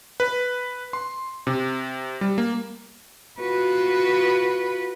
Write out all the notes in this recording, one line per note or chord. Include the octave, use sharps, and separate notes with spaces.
B4
C6
C3
G3
A#3
F4 F#4 B4